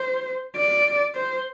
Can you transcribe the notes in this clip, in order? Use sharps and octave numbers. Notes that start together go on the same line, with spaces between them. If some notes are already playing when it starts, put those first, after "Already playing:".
Already playing: C5
D5
C5